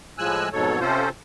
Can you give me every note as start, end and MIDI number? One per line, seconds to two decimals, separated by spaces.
0.18 0.49 45
0.18 0.49 53
0.18 0.49 56
0.18 0.49 80
0.18 0.49 88
0.18 0.49 90
0.53 0.80 41
0.53 0.80 44
0.53 0.80 47
0.53 0.80 54
0.53 0.80 69
0.53 0.80 73
0.80 1.09 48
0.80 1.09 60
0.80 1.09 61
0.80 1.09 65
0.80 1.09 69
0.80 1.09 72